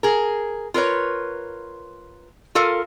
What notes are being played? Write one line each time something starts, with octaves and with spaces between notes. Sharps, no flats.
G#4 A#4
F4 A#4 B4 C#5
F4 A4 A#4 F5